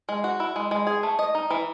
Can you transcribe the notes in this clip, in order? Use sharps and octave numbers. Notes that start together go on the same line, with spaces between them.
G#3
F#4
E4
G#3
G#3
G#4
A3
D#5
D#4
E3